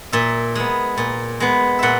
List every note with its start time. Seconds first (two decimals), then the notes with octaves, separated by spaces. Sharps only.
0.12 A#2 E5
0.55 G#3 B3
0.98 A#2
1.40 G#3 B3
1.79 A#2 E5 F#5